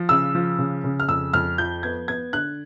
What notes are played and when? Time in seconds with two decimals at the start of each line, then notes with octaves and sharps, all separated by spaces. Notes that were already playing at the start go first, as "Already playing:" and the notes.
Already playing: F3
0.09 C#3 E6
0.35 F3
0.59 C#3
0.84 C#3
1.00 F6
1.08 F2 E6
1.33 F2 F6
1.58 F3 G6
1.83 B3 G#6
2.08 B3 G#6
2.33 D3 F#6